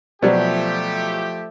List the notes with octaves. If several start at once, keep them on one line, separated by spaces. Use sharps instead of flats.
B2 F3 F#3 A3 G4 C5 D5 F#5